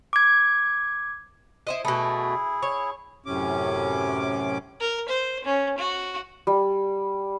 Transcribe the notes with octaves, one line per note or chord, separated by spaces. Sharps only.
D6 G#6
E4 C5 D#5
B2 A3 E4 G#4
C#5
F#2 A2 C3 C#4 D6
A#4
C5
C#4
F#4
G3